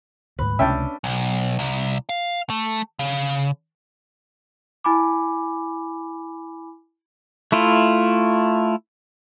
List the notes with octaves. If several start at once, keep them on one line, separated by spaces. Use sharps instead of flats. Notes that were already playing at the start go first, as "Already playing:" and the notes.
D2 G#2 B4
C#2 C3 A3 C#4 D4 E5 G5 A5
B1
C2
F5
A3
C#3
E4 G#5 B5 D6
A3 E4 F4